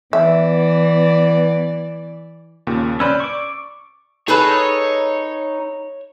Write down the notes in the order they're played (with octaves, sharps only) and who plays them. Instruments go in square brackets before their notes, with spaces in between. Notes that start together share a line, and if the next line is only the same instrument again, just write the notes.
[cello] E3 D5 [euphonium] B3 [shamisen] E5
[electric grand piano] D#2 A#2 C#3
[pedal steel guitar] C#4 B4 C5 [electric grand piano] D5 B5 E6
[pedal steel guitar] C#6 D6
[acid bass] D#4 [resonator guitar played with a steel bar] G#4 A4 B4 [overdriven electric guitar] C#5